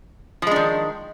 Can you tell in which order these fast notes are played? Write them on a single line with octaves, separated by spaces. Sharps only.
F3 G#3 D4 D#3